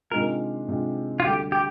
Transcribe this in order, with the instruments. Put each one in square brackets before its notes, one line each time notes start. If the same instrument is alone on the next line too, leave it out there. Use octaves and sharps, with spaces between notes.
[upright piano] C3 D#3 G#3 D4 F4 [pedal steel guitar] A#4
[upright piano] C3 D#3 G#3 D4 F4
[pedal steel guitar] F4
[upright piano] D2 D3 G3 [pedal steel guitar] G4
[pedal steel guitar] G4